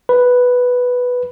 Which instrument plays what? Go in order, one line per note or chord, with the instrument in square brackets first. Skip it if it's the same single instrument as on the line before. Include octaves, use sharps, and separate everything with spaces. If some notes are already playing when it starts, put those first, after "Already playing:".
[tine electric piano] B4